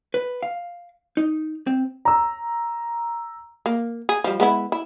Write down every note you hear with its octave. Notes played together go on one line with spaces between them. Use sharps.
B4
F5
D#4
C4
A#5 E6
A#3
G#4
F3 G3
G#3 B3 E4
E4